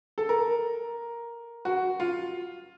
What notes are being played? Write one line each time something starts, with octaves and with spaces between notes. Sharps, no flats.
A4
A#4
F#4
F4